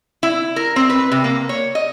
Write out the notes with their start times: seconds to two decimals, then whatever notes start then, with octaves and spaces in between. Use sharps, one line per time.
0.23 E4
0.56 A#4
0.76 C4
0.90 B4
1.12 C3
1.24 A#3
1.49 C#5
1.75 D#5